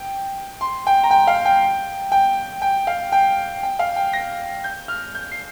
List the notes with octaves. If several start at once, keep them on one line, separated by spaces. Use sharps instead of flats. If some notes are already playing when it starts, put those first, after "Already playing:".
Already playing: G5
C6
G5
A#5
G5
F5
G5
G5
G5
F5
G5
G5
F5
G5
A#6
G6
F6
G6
C7